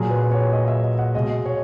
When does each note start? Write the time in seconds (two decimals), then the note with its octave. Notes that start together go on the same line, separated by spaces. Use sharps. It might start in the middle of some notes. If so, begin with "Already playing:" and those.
Already playing: A#2 F#3 G#4
0.11 B4
0.31 C#5
0.52 D#5
0.68 E5
0.83 D#5
0.99 F#5
1.14 B2 G#3 D#5
1.46 C#5